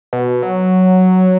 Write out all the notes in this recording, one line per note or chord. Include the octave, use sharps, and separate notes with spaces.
B2
F#3